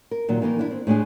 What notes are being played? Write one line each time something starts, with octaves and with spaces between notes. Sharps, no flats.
A#4
A#2 D#3 F#3
D#3 E3 A#3 D#4 A#4
D4 E4
C4
A2 G#3 D4 G#4